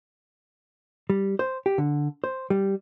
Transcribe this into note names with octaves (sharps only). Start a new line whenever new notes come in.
G3
C5
G4
D3
C5
G3